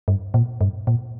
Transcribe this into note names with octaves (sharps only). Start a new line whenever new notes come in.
G2
A#2
G2
A#2